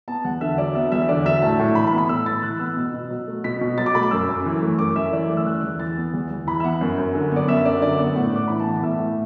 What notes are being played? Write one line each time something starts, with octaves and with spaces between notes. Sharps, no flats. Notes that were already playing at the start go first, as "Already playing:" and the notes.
B3 A5
E2 F#5
D3 E5
F#3 D5
B3 E5
E2 E5
D3 D5
F#3 E5
A2 A5
A2
E3 B5
B5
B3
B5
A2 E6
A2 A6
E3 F#6
B3 E6
B2
B2
F#3
A3
B2 B6
B2
F#3 A6
D6
A3 B5
D6
F#2 E6
F#2
E3
A3
F#2 D6
F#2 E5
E3 D5
A3
E6
E2 F#6
E2
E3 A6
B3
E2
E2
E3 B5
E5
B3 F#5
F#2
F#2
D3
B3 D5
F#2 E5
F#2 D5
D3 D5
B3
A2 F#5
A2 D6
E3 B5
A5
B3 F#5
A2 E5
A2